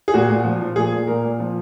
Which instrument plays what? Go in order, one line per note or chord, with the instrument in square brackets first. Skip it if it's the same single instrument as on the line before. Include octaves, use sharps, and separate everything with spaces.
[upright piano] G#4
A#2 F#4
A#2
F3
F3
A#2 G#4
A#2
A#2 A#4
A#2
F3